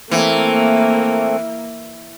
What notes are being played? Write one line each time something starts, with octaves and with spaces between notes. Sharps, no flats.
E3 A3 A#3 C4